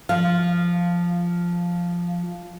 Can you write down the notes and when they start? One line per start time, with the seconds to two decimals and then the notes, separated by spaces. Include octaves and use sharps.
0.09 F3 F5